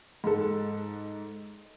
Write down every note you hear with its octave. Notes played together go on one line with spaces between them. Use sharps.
G#2 A4